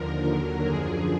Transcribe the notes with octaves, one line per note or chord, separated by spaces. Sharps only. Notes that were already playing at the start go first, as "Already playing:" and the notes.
Already playing: D#2 D3 F3 A#4
D#2 D3 F#3
F#2 D3 F3 G#4